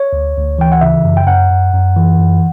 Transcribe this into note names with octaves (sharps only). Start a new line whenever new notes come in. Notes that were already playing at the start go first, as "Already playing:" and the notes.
Already playing: C#5
D2
D2
E3 G5
F#5
C#3 E5
F#2
G5
F#2 F#5
F#2
F#2
E3
F#2